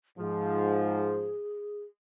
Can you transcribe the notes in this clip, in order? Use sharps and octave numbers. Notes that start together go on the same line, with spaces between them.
G#2 F3 G#4